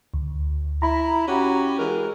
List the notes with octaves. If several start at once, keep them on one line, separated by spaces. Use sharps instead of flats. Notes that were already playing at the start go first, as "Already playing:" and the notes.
D2
E4 A#5 B5
C#4 F#4 G4
E3 G#3 A#4